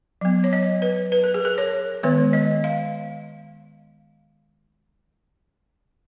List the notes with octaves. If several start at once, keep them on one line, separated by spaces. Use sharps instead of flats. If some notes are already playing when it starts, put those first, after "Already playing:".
F#3 B3
C#5
D#5
B4
B4
A#4
G#4
A#4
C#5
D#3 G#3 B3 C#5
D#5
F5